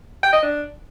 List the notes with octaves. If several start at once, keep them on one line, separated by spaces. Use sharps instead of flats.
G5
D#5
D4